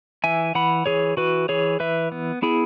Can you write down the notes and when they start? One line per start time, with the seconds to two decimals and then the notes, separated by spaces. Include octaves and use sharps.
0.24 E3 E5 G#5
0.55 E3 F#5 B5
0.86 E3 G#4 C#5
1.17 E3 F#4 B4
1.49 E3 G#4 C#5
1.80 E3 B4 E5
2.12 B3
2.42 B3 E4 G#4